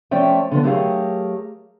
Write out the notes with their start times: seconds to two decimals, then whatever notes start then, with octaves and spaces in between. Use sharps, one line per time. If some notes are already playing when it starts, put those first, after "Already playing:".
0.11 F3 A3 C#4 D5 E5 G5
0.52 D3 F3 B3
0.63 F#3 A3 G4 G#4 A#4 F5